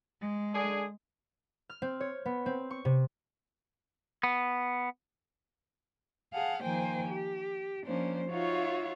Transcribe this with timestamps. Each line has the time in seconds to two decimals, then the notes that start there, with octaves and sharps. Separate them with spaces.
0.21 G#3
0.54 D3 D4 G#4
1.69 F6
1.82 C4
2.00 C#5
2.26 B3
2.46 C4
2.71 C#6
2.85 C3
4.23 B3
6.33 G#4 F5 F#5 A5
6.63 D#3 F3 A#3 C5 G5 G#5
7.07 G4
7.84 F3 A#3 C#4 D4 C5
8.30 D#4 F4 F#4 C#5 E5 F5